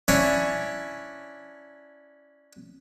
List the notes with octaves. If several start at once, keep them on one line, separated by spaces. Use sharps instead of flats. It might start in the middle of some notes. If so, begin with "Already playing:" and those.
C#4 D4 E4 C#5